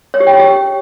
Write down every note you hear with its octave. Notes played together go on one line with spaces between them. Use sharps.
C#5
G4
G5
C#5
G4